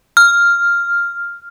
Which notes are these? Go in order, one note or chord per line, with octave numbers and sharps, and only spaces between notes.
F6